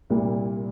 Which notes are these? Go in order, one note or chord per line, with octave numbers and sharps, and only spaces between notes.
C2 A#2 G3 A#3